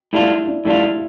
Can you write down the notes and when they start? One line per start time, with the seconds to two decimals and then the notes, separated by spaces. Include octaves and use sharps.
0.13 A2 G3 D4 E4 F4
0.48 D4
0.65 A2 G3 D4 E4 F4